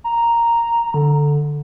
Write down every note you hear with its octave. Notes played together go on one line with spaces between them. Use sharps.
A#5
D3